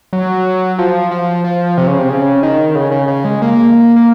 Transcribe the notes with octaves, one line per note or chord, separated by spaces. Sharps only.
F#3
F3
F3
F3
C3
C#3
C3
C#3
D#3
C#3
C#3
C#3
G#3
A#3
A#3